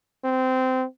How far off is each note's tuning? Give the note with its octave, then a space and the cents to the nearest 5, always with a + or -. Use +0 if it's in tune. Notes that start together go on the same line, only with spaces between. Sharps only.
C4 -20